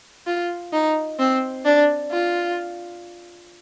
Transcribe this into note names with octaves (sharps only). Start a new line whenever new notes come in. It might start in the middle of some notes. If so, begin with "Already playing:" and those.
F4
D#4
C4
D4
F4